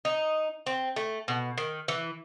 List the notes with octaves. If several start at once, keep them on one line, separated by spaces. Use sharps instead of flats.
D#4
C4
A3
B2
D#3
E3